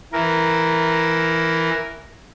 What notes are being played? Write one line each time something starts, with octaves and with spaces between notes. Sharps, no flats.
E3 A#4